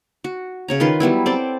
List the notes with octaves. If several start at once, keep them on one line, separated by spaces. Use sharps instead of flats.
F#4
C#3 C#5 A#5
D#3 F4 B4 C6
F#3 G3 B3 E4
C4 A4 C5 D5